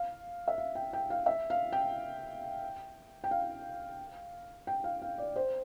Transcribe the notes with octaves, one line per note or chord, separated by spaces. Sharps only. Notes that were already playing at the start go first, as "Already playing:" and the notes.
Already playing: F5
E5
F5
G5
G5
F5
E5
F5
G5
G5
F5
G5
F5
F5
D5
C5